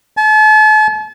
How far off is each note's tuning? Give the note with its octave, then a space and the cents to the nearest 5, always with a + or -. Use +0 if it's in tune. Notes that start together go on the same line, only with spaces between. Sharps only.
A5 -40